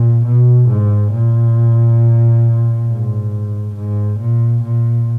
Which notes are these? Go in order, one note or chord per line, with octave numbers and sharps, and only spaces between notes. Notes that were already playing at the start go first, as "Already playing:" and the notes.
Already playing: A#2
B2
G#2
A#2
G#2
G#2
A#2
A#2